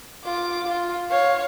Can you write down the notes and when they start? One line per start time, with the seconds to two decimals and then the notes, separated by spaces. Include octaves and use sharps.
0.25 F4 D6
0.67 F4
1.11 C#5 F5